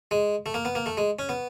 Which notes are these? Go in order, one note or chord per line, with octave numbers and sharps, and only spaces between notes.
G#3
A3
A#3
B3
A#3
A3
G#3
C#4
B3